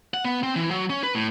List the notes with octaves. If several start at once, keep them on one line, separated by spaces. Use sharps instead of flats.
F#5
B3
C4
E3
F#3
C#4
B4
A2